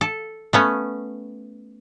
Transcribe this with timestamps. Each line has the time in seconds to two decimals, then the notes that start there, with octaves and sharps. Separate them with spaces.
0.01 A4
0.53 A3 B3 C#4